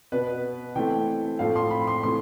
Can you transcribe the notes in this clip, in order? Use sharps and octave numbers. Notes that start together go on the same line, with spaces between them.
B2 B3 B4
E3 A3 C4 G5
A2 F3 A3 C4 F5
C6
B5
C6
E3 A3 C4 C6